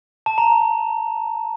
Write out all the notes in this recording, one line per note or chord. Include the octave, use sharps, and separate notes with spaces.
A5
A#5